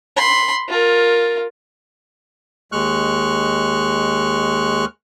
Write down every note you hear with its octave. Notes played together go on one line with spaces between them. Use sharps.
B5 C6
F4 A#4
D#2 G#3 C#6 F6 F#6